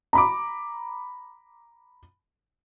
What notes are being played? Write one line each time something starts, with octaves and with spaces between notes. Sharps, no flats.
A#5 B5 D6